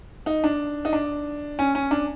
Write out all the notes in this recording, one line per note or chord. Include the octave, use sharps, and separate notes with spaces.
D#4
D4
D#4
D4
C#4
C#4
D4